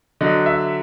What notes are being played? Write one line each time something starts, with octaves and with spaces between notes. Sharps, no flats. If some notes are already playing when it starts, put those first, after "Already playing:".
D3 F#3 D#5
E5